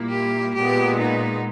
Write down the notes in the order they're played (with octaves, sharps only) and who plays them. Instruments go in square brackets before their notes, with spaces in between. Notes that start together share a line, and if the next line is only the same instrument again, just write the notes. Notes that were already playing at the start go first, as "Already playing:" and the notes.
Already playing: [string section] A#2 G3 A#3 E4
[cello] G4
[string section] A#2 G#3 B3 [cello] G4
[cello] D#4